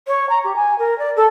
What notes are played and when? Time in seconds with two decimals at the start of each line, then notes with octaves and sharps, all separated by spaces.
0.07 C#5
0.29 A#5
0.44 G4
0.56 G#5
0.78 A#4
0.98 D5
1.16 A4